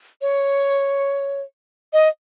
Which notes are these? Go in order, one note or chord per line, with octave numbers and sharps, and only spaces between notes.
C#5
D#5